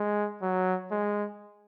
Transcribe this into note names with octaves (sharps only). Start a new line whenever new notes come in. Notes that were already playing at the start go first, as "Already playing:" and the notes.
Already playing: G#3
F#3
G#3